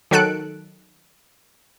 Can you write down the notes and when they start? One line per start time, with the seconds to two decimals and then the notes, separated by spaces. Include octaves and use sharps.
0.11 D#3 F#3 A4 F#6 C#7 D7